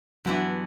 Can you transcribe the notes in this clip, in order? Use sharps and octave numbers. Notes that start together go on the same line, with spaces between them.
G2 E3 F#3 B3 D4